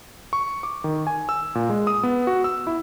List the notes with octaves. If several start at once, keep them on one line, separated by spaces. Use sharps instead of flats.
C#6
D6
D#3
G#5
E6
A#2
G#3
D#6
B3
F#4
E6
E4